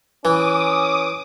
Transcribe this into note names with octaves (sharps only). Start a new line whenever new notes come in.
E3 C#4 D6 D#6